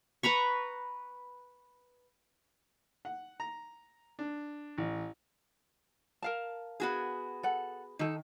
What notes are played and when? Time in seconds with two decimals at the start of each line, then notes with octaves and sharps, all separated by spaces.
0.23 B4 A#5 B5 C#6
3.05 F#5
3.40 A#5
4.19 D4
4.78 A1
6.22 A#4 F5 A5
6.80 B3 F#4 G#4
7.43 A4 F#5
7.99 D#3 D#4 A4